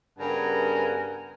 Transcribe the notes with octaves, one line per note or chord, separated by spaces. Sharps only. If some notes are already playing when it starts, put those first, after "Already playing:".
G2 C#3 B3 A#4 F#5 G#5